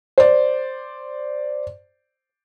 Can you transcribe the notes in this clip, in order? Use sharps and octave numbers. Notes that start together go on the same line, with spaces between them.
C5 D5